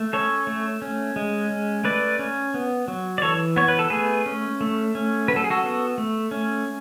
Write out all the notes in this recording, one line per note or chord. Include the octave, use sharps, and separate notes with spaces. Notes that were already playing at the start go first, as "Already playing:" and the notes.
Already playing: A3
C#4 A4 C#5
A3
C#4
G#3
C#4
A3 B4 D5
C#4
B3
F#3
D5
E3 A4 C#5
B3 C#5
B4
A4
A3 G#4 B4
C#4
A3
C#4
F#3 B4
A4
G#4
F#4 A4
B3
A3
C#4